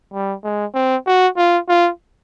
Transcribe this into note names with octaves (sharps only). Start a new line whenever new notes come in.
G3
G#3
C4
F#4
F4
F4